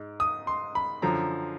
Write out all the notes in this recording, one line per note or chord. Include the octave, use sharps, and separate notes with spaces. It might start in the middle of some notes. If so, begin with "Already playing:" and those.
Already playing: G#2
D#6
C6
B5
F#2 D3 F3 A#5